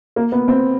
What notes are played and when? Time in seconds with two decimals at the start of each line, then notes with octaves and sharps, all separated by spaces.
0.16 A#3
0.32 B3
0.48 C4